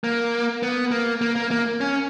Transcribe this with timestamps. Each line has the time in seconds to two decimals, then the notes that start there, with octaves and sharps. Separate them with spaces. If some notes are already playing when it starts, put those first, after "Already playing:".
0.04 A#3
0.63 B3
0.91 A#3
1.21 A#3
1.36 A#3
1.51 A#3
1.81 C#4